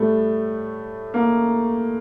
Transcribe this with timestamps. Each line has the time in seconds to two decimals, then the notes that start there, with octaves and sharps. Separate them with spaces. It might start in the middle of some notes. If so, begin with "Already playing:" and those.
Already playing: A2 G3 A3
1.14 A#3